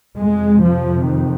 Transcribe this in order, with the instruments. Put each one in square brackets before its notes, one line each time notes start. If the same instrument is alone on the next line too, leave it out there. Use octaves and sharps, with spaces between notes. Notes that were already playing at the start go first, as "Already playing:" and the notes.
[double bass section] F2 C3 G#3
F3
D#3